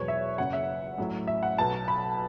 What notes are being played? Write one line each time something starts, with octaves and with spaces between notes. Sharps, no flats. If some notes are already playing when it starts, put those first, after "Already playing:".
Already playing: E1 E2 B2 F#3 B4 C#5
E5
F#1 F#2 C#3 F#3 F#5
E5
A1 A2 F#3
E5
F#5
B1 B2 F#3 A5
B5